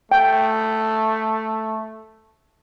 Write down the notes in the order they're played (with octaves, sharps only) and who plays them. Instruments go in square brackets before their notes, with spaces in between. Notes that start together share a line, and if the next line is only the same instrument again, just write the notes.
[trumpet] A3 [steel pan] G5